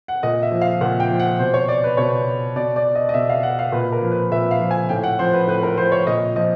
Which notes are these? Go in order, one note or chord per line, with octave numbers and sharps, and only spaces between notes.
F#5
A#2 D#5
E5
F3
F5
A#2 F#5
G5
F3
F#5
B2 C5
C#5
D5
B4
B2 C#5
B2 D5
D5
D#5
D#5
B2 E5
F5
F#5
F5
A#2 B4
A#4
F3
B4
A#2 E5
F5
F3
G#5
A2 G5
F#5
F3 C5
B4
A2 B4
A#4
F3 C5
C#5
A#2 D#5
F3 D#5